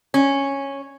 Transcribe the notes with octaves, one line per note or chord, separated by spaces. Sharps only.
C#4